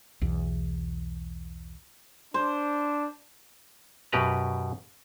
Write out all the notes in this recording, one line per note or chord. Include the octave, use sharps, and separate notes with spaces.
B1 E2
D4 C5
F#2 B2 G4 B4 A#5